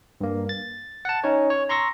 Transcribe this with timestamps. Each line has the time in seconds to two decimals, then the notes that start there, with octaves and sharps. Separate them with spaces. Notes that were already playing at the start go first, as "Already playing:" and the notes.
0.21 G2 A#3
0.49 A6
1.05 F#5 A5
1.24 C#4 D#4 C#5
1.50 C#5
1.69 A#5 C6 C#6 E6 A#6